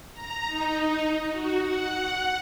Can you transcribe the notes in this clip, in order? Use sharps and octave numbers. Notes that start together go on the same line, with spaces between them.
A#5
D#4
F#4
F#5